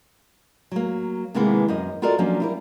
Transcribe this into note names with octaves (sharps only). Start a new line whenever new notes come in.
F#3 A#3
C3 D#3 E3 G#3 A#3 B3
F#2 A#4 D#5
F4 F#4 A4 A#4 D5 D#5
F3 F#3 A#3 C#4 D4
G3 E4 A#4